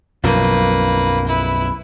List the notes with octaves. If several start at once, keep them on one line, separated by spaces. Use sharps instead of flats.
B1 F#2 F3 A#3 B4
E4 B4